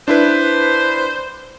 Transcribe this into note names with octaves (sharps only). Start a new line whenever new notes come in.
D4 E4 B4 C5